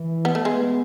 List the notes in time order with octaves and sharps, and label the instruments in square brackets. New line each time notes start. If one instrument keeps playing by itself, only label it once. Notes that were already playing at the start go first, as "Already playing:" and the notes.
Already playing: [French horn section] E3
[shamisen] B3
A3
[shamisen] G#3 [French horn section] B3